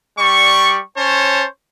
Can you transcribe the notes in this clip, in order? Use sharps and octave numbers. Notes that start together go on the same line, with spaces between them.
G3 D5 C#6
C#4 C5 C#5 A5